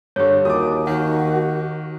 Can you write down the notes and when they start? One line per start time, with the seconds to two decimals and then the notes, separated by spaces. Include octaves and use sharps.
0.16 G2 D3 G4 G#4 C#5
0.45 D#2 F4 F#4 D#5 D6 D#6
0.87 D#3 F#4 F#5